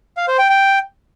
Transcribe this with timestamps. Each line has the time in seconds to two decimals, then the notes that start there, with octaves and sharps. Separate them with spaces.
0.17 F5
0.28 C5
0.39 G5
0.50 G5